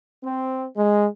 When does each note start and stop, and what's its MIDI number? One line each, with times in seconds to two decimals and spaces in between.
0.24 0.65 60
0.76 1.06 56